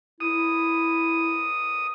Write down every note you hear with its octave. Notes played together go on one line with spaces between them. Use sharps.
E4 D#6